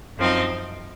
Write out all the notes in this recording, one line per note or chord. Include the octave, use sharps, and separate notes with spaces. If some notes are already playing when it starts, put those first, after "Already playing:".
F#2 F3 C4 D#4